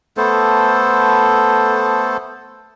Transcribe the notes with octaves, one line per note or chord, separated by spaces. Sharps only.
A3 B3 A4 C5